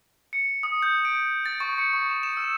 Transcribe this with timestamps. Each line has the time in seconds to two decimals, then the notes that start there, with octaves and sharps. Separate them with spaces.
0.33 C#7
0.63 D#6
0.83 G6
1.05 D7
1.46 A6
1.60 C#6
1.78 C#7
1.93 C#6
2.10 E7
2.23 E7
2.37 E6